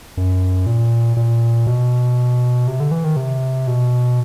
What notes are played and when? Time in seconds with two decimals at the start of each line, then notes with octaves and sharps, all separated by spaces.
0.17 F#2
0.66 A#2
1.17 A#2
1.67 B2
2.67 C3
2.80 D3
2.91 E3
3.04 D#3
3.17 C3
3.67 B2